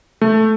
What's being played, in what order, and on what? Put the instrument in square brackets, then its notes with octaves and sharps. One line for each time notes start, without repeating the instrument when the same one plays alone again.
[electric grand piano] A3